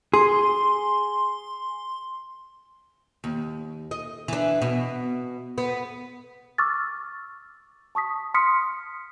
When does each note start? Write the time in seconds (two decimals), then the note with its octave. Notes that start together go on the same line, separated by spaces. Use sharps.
0.14 G#4 C6
3.24 D#2
3.91 D#5
4.28 E3 D4
4.62 B2
5.58 B3
6.58 C#6 D6 E6 F6 A6
7.95 A5 C#6 D#6 B6
8.34 C6 D#6 F6 B6 C#7